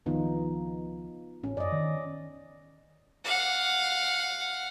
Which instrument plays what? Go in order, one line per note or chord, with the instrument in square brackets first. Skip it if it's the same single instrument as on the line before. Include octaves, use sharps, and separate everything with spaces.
[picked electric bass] C#2 D#3 F3 [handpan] B3 D#4 F4
[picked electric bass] A1 [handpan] C#4
[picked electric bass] F#2 [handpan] D5 D#5
[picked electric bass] D#3
[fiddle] F5 F#5